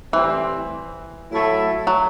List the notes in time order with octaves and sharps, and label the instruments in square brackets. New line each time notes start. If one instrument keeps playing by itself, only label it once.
[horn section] A2 G3 C4 [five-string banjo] E3
[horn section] A2 F#3 A3 E4 A4
[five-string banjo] F#3